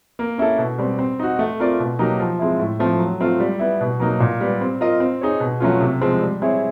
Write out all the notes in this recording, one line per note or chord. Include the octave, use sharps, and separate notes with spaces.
A#3
C#4 E4 A4
B2
G3 C4
C4
D#4 F#4
A3
C4 F4 A#4 D5
B2
F#3 A#3 D#4 G4
F3
G#3 C4 E4
A2
F3 A3 C4
F#3
A3 C4 F4
G3
B3 E4
B2
F#3 A#3 D#4
A#2
G3 B3
C4
F4 A#4 D#5
C4
D#4 G#4 C#5
B2
F#3 A3 C#4 F4
C3
F3 G#3 C4
G3
C4 E4 G#4 C#5